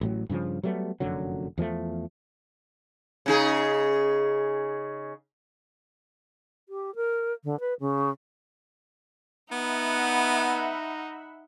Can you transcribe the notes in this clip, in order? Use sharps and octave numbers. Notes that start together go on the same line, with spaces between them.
A1 A2 F#3
G2 C#3 E3 F3
F#3 G3 A3 B3
F1 F#2 D3 F#3
E2 F3 G#3 A3
C#3 D#4 G#4
G4
A#4
D3
B4
C#3
B3 D#4 E5 F#5 B5